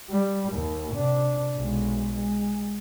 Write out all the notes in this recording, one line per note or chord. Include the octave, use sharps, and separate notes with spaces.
G3
D#2
C3 D4
B1 G#3
G#3